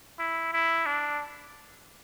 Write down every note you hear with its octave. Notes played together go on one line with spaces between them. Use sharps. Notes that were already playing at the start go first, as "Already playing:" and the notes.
E4
E4
D4